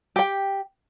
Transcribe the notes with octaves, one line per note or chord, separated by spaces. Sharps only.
G4 G5